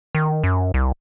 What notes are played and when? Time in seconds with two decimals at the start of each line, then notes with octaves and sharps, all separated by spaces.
0.15 D#3
0.44 F#2
0.74 C2